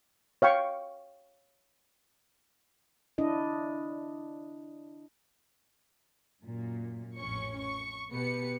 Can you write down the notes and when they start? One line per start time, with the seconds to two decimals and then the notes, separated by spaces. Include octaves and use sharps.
0.42 C#5 F5 G5 C#6
3.18 D4 E4 D#5
6.43 F#2 A#2
7.18 A1 F2 C#4 C#6
7.59 C#6
8.11 B2 B3 G4 B4 C#7